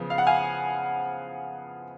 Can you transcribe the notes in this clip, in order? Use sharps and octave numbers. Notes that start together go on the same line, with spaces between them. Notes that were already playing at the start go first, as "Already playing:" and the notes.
Already playing: C#3 F3 B3
F5
F#5
F5 G#5